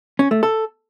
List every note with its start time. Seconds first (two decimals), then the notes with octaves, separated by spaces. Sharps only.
0.19 C#4
0.31 A3
0.43 A4